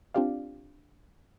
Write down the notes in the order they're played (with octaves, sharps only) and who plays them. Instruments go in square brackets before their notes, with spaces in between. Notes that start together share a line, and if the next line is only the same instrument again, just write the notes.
[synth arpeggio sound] C4 D4 F4 G4 D5 F5